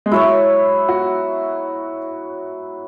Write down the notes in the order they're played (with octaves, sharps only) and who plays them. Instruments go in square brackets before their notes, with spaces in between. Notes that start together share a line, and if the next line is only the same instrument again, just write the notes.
[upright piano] G#3
[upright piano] F#3 [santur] E4 C#5 E5
[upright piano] F#4